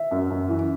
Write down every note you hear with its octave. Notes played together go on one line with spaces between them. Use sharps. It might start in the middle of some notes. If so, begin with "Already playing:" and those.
Already playing: E5
F#2
F#2
E3